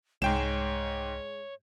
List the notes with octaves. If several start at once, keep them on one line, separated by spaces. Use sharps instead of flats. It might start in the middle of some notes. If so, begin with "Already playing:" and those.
C2 G#2 G#3 C#5 G5 E7